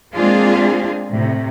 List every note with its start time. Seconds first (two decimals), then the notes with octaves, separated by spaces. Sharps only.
0.15 G#3 A#3 C4 D4 F4 G#4
1.13 A2 C3